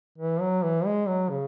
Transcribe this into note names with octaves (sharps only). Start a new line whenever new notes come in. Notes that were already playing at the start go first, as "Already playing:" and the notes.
E3
F#3
E3
G#3
F#3
C#3